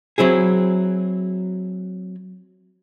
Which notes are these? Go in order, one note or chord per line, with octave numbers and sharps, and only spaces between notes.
F#3 C4 E4 G#4